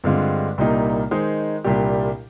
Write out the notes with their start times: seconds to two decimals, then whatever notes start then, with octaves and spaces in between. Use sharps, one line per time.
0.04 G2 D3 G#3 C4 F4
0.58 C2 A#2 G3 A#3 D#4
1.11 D#3 G#3 D#4 G#4 C5
1.64 C2 A#2 G3 D4 G4